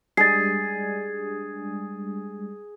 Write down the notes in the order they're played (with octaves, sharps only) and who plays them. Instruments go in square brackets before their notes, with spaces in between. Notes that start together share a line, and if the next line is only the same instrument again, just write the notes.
[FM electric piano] G3 G#3 D4 [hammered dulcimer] G#4 [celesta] A6 C7